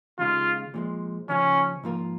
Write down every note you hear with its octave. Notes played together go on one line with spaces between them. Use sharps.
D#2 C#3 G#3 F4
A#2 F3 G#3
D#2 C#3 F3 C#4
G#2 F3 A#3 F4 A#4